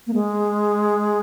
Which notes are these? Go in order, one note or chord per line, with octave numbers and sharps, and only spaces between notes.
A#3
G#3